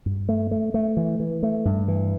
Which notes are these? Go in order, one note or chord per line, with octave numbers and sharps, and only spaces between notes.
G2
A3
A3
A3
E3
E3
A3
G2
E3